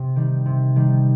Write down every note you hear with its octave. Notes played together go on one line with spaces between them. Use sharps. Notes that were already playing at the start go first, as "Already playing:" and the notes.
Already playing: C3
D#3 G3
C3
D#3 G3